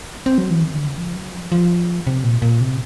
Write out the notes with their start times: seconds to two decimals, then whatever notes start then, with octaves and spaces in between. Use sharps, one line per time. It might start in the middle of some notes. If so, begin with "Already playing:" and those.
0.26 C4
0.38 F#3
0.50 E3
0.62 D#3
0.73 D3
0.86 C#3
0.97 F3
1.16 F#3
1.33 F3
1.52 F3
2.07 C3
2.24 A#2
2.42 A#2
2.61 C3